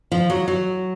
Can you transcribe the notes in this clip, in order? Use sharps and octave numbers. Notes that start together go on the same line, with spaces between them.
F3
F#3
F#3